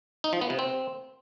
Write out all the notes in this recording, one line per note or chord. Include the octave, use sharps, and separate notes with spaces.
D#4
F3
B3
C3
C4